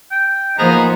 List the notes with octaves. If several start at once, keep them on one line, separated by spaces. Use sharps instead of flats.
G5
F3 A#3 B3 D#4 G#4 C5 A#5